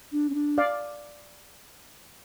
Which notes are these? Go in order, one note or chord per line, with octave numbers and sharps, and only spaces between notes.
D4
C#4
D4
D5 F5